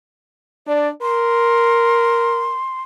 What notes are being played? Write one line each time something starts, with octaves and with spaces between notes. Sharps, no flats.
D4 D5
A#4 C6